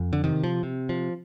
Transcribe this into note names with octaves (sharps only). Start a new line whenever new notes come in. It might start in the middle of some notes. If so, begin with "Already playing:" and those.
Already playing: F2
D3
C3 D#3
F3
C3
F3